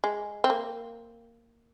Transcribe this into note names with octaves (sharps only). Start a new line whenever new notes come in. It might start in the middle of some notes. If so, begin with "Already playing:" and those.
G#3
C4
A#3